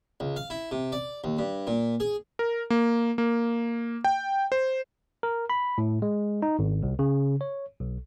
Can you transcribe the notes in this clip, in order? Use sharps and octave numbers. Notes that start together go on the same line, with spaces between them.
C#2
F5
E4
C3
D5
D#2
G2
A#2
G#4
A#4
A#3
A#3
G5
C5
A#4
B5
A2
G#3
D#4
G#1
C2
C#3
C#5
B1